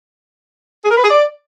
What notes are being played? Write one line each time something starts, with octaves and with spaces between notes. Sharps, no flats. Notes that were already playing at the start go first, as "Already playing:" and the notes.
G#4
A#4
B4
G#4
D5